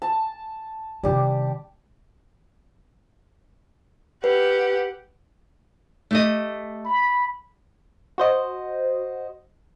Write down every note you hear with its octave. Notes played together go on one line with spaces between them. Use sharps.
A5
C3 D#3 G3 G4
G4 B4 F#5
A3 G4 D#5
B5
F#4 C5 D#5